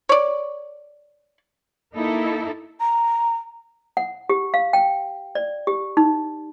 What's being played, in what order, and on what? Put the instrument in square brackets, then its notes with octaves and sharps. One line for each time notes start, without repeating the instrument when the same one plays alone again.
[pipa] C#5 D5
[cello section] A#3 D#4 E4 A4
[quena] A#5
[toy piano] F#5
G4
F5
G5
D5
G4
D#4